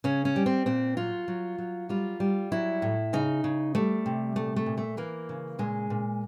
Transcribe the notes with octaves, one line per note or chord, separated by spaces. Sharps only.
C#3 C#4
C#4
G3
C4
A#2 C4
F#3 F4
F#3
F#3
G3 F4
G3
F#3 E4
A2
C#3 D#4
C#3
G3 A3
C3
A#2 A3
A3
A#2
A3
E3 A#3
C#3
A#2 G#3
A#2